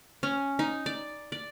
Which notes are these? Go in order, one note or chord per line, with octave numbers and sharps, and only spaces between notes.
C#4
D#4
D5
D5